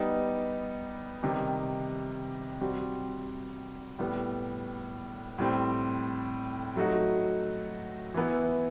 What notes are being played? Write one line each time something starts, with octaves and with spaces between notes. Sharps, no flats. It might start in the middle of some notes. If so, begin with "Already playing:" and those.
Already playing: G3 B3 D#4 G4
C3 D#3 G3 D#4 G4
G3 C4 F#4
A2 G3 B3
A2 G3 C4
F#3 A3 D#4 F#4
E3 B3 E4